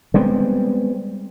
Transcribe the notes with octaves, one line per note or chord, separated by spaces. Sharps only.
G3 G#3 B3 C4